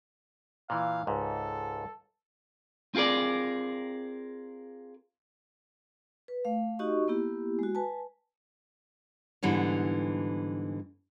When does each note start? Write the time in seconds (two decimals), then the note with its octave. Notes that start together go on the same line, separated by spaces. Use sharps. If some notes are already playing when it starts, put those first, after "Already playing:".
0.70 A#2 E3 F5
1.07 C#2 G#2 A4
2.95 C4 F4 G#4 A#4 D5
6.28 B4
6.45 A3 F5
6.79 D#4 F#4 G4 D#5 C#6
7.08 A#3 B3 E4 G4
7.59 G#3 F#4
7.75 B4 G#5 A5
9.43 G#2 D3 E3 G3 B3